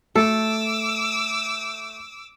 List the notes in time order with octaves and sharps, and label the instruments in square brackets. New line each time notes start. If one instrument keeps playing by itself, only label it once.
[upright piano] A3 [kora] A4 [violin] D6 E6